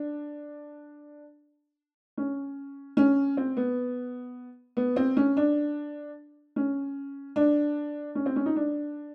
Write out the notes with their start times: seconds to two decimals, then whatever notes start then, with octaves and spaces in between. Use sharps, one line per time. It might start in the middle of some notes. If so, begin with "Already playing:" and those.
Already playing: D4
2.17 C#4
2.97 C#4
3.37 C4
3.57 B3
4.77 B3
4.96 C4
5.17 C#4
5.37 D4
6.56 C#4
7.36 D4
8.15 C#4
8.26 C4
8.36 C#4
8.46 D#4
8.56 D4